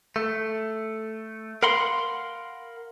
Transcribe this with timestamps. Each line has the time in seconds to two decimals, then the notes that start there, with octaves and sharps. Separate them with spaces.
0.16 A3
1.63 A#4 F5 F#5 B5 C6